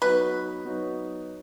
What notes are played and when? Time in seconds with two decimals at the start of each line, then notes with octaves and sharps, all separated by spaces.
0.02 F#3 B3 D#4 F#4 B4
0.65 F#3 B3 D#4 F#4